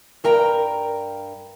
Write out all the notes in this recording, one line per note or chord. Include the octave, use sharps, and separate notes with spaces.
G2 A#4 G5 A#5